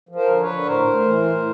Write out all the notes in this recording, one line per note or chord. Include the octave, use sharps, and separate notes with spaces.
F3
A#4 C5
D3 C5
B4 C#5
D3
A2 A#4 C5
A2
E3
A2